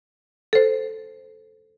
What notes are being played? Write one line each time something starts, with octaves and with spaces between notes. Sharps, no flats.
A4 C5